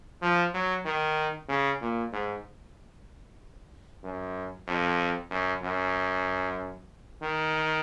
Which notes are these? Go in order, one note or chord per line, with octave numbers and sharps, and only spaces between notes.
F3
F#3
D#3
C#3
A#2
G#2
F#2
F2
F#2
F#2
D#3